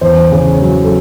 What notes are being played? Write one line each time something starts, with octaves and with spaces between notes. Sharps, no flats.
E2 C5
C#3
F#3
A4